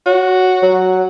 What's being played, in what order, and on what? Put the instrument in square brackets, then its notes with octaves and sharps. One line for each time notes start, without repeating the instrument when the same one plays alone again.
[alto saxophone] F#4 [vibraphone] C#5
[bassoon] F#3